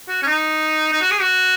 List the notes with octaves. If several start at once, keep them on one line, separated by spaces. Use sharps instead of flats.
F#4
C#4
D#4
D#4
F#4
G#4
F#4